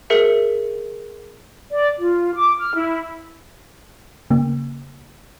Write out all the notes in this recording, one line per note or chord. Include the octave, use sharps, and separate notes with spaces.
G#4 A#4 E5 C#7
D5
F4
D6
F6
E4
C#3 A#3